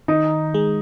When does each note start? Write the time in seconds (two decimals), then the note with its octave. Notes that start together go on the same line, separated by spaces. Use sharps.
0.08 D#3 D#4
0.54 G#3